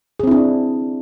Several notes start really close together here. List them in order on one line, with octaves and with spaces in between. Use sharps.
G#4 C4 E4 D4